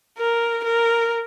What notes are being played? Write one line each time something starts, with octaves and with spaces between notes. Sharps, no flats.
A#4
A#4